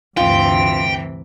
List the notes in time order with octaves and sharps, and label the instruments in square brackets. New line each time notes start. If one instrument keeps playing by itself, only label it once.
[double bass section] D2 G2 [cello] C3 E3 [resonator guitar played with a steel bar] F4 [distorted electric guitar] G5